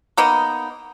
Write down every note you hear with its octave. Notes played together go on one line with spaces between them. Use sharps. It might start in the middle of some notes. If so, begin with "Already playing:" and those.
A#3 B3 D#4